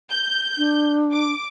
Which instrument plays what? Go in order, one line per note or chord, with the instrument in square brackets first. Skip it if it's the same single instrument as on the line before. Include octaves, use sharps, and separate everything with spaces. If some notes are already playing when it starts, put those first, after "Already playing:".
[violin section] G6
[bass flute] D4
[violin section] D6